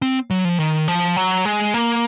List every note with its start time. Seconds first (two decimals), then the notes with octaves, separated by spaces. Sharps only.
0.02 C4
0.30 F#3
0.45 F3
0.59 D#3
0.88 F3
1.17 F#3
1.45 G#3
1.74 A#3